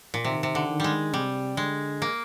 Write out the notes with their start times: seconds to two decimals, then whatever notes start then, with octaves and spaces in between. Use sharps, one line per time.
0.14 A#2
0.24 C3 D#3
0.43 C3
0.55 D3
0.69 D#3
0.80 G3 G#3
1.14 C3 G3
1.57 D3 G#3
2.02 A#3